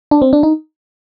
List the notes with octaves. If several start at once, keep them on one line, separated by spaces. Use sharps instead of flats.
D4
C4
D4
D#4